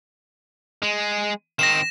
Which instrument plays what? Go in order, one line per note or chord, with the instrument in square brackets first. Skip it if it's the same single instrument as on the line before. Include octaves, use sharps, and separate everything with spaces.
[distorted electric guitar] G#3
[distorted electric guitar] D#3 C4 [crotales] A#6 E7